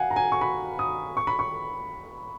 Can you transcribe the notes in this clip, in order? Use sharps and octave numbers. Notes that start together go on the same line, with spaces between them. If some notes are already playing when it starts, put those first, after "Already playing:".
Already playing: F5 F#5 G#5
A#5
G#5
C#6
B5
D#6
C#6
B5
C#6